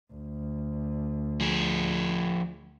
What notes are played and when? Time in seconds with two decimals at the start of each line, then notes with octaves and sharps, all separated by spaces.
0.13 D2
1.41 F3 G#4